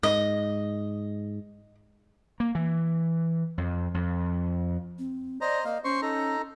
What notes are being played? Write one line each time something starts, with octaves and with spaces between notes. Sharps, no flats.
G#2 D#5
A#3
E3
F2
F2
C4
C5 D5 D#5 A#5
A#3 D#5 F5
C#4 C5 C6 C#6
D#4 A4 A#5